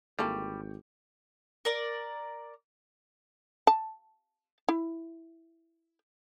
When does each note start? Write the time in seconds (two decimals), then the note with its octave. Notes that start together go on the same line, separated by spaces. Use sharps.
0.19 G#1 E3 G3 A#3 A4 G5 C#6 D6
1.65 A#4 D5
3.67 A5
4.69 E4